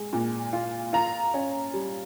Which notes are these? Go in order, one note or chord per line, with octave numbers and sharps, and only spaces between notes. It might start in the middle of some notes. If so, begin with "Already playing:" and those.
Already playing: G#3
A#2
F4
F4 A#5
C#4
G3